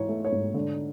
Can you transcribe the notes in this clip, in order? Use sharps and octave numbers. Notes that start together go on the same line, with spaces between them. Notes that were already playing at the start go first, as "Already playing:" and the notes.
Already playing: G#2 E3 C#5
A3
C#5
G#2
D3